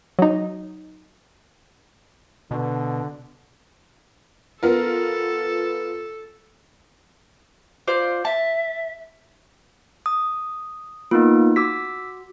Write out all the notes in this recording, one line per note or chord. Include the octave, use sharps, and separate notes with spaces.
F#3 D#4
B2 D3
B3 F4 A4 A#4
F4 C5 D5
E5 A5
D#6
A#3 B3 D#4 F4
F#4 D6 E6 B6